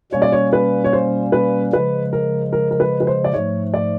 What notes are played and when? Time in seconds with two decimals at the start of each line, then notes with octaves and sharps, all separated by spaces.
0.12 B2 G3 A#3 C#4 C#5
0.22 D5
0.32 C#5
0.53 B4
0.84 C#5
0.93 C5
1.32 B4
1.72 C#3 F3 G#3 B4
2.13 A#4
2.53 A#4
2.71 A#4
2.80 B4
3.00 B4
3.07 C5
3.24 D5
3.33 G#2 F3 A3 C#5
3.74 D5